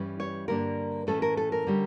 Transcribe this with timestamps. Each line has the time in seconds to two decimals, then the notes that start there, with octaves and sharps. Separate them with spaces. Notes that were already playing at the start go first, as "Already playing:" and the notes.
Already playing: G2 E3 G3 C#4
0.20 C#5
0.48 G2 D3 G3 A#3 D4 A#4
1.07 A2 E3 A3 C#4 A4
1.22 A#4
1.37 A4
1.52 A#4
1.67 D3 G3 C#4